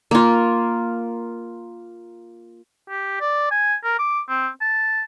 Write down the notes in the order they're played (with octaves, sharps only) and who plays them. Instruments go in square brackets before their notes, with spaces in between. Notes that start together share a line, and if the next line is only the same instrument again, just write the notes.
[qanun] A#3 F4
[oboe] G4
D5
G#5
A#4
D6
C4
A5